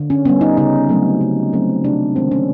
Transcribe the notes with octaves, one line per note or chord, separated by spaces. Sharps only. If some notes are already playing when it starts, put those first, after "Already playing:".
Already playing: D3
C#4
G3 B3 C#4
D#4
C#3 D#4
F#3 A3 C4
C#3
F#3 A3 C4
C3 D4
D#3 G#3 C4
C#4